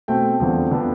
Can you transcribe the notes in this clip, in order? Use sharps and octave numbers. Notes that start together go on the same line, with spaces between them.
B2 A3 C4 G5
E2 D3 F3 C4
D3 F3 B3 D4